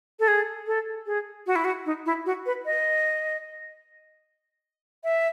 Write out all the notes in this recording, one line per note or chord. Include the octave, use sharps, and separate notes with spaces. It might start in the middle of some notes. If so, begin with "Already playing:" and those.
A4
G#4
A4
G#4
F#4
E4
F#4
D#4
E4
F#4
B4
D#5
E5